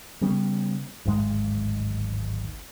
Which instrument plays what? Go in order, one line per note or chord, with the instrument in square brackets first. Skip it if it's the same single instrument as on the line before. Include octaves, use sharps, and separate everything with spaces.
[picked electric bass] C#3 G3 B3 C#4
D1 G#1 G#2 G#3